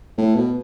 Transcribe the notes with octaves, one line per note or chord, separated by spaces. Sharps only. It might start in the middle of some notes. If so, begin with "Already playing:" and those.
A2
B2